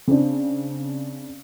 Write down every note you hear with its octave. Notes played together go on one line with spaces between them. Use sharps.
C#3 C4 D4